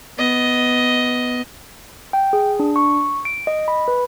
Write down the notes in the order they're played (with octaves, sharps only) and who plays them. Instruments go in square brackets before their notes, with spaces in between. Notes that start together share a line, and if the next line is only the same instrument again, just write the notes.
[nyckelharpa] B3 D#5
[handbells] G5
G#4
D4
C#6
D7
D#5
B5
B4